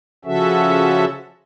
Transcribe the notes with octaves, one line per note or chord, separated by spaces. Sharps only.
C#3 F3 C#4 F#4 A4 E5